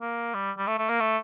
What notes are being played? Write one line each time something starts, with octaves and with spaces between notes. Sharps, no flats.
A#3
G3
G3
A3
A3
A#3
A3